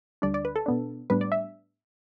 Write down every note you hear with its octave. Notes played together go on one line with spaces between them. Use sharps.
D2 D3 G3 D4 D5
D5
B4
A4
B2 B3 D4
A2 G3 B3 D4 B4
D5
E5